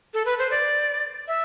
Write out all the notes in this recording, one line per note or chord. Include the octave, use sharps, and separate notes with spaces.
A4
B4
C5
D5
E5